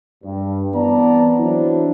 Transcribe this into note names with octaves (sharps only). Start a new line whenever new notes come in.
G2
E3 B3 C4 D5 A5 A#5
E3 F#3 C4 D4 E4 F#4